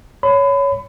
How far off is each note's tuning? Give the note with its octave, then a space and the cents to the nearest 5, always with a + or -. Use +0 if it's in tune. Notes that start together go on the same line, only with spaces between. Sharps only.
C#5 +10 B5 +30